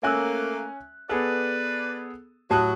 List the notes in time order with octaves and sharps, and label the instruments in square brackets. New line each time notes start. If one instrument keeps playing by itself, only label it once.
[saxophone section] A3 A#3 [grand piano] C#4 G#5 F#6 [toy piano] E5 E6
[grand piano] B3 G#4 A4 [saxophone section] B4 D5
[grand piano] A2 D#6 F#6 [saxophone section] F#3 [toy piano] G4 A5